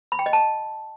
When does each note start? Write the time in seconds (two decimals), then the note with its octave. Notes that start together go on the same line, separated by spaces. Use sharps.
0.12 B5
0.19 G5
0.26 D#5
0.33 A5